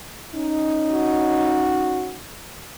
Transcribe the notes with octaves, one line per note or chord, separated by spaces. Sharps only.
C#4 D#4
F#4